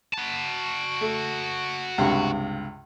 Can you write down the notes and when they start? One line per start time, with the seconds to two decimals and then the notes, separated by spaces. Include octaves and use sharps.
0.13 F#4 A5
1.01 A3
1.98 C#2 G2 C3